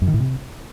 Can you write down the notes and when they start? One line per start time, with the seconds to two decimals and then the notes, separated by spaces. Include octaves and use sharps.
0.02 F#2
0.08 D#3
0.14 A2
0.20 C3